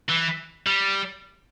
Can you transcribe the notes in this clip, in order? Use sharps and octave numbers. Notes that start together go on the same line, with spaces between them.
E3
G3